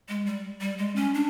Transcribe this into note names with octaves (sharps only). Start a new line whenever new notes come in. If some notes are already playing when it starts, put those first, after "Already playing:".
G#3
G3
G3
G#3
C#4
D4